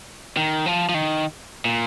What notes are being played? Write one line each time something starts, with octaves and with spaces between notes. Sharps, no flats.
D#3
F3
F3
D#3
A#2